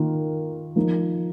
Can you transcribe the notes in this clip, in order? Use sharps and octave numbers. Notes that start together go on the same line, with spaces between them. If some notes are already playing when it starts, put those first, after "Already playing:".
Already playing: D#3 A#3 F4
F3 A#3 D#4